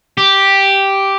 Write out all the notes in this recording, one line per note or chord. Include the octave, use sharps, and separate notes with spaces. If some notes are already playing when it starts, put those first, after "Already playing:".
G4